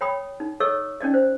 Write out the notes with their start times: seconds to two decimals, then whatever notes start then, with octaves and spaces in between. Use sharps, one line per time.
0.01 C#5 G5 B5 D#6
0.40 D#4
0.60 A4 C#5 D#5 C#6 E6
1.01 C#4 D#4 D5 D#5
1.14 C5